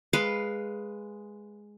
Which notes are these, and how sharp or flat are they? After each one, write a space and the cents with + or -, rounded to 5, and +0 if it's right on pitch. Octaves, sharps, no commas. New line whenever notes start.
G#3 +0 B4 +0 F5 +0